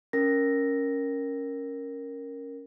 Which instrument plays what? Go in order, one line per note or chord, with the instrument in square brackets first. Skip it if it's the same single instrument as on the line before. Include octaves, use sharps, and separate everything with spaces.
[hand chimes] C#4 A#4 A#6